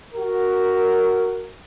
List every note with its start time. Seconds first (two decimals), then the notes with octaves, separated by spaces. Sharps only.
0.15 F#4 A#4